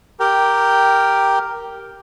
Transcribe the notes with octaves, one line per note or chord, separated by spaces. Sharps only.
G4 A#4 G5